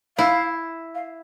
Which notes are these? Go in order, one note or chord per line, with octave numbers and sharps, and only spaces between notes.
E4 F5
F5